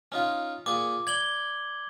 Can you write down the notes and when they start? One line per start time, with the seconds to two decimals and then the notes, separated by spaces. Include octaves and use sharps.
0.12 C#4 D#4 F4
0.66 A#2 G#4 D6
1.07 D5 G#6 F#7 G7